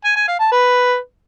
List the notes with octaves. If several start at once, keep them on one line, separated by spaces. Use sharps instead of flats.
G#5
G#5
F5
A5
B4